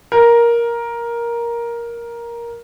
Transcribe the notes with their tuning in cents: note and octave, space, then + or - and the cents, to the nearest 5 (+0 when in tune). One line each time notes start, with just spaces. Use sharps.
A#4 +10